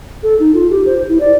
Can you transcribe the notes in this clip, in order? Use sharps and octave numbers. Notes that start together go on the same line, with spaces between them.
A4
D#4
F4
G4
C5
E4
D5